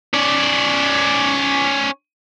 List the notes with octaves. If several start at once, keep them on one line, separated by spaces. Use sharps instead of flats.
C#4 D5